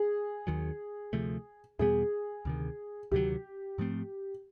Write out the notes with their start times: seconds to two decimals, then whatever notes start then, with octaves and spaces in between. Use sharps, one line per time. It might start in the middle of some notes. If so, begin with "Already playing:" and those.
Already playing: G#4
0.47 D#2 D#3 F#3
1.13 D2 C3 F3 A3
1.79 E2 B2 G3 B3 G#4
2.45 D2 C3 D#3
3.12 D2 C3 D#3 F#3 G4
3.78 G#2 F3 A3 C4